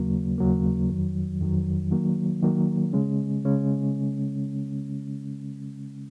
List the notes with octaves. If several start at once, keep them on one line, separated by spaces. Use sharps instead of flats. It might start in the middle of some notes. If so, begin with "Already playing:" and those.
Already playing: D#2 C#3 F#3 A#3
D#2 C#3 F#3 A#3
F2 D#3 F#3
F2 D#3 F#3
D#3 F#3 A#3
D#3 F#3 A#3
C#3 G#3 C#4
C#3 G#3 C#4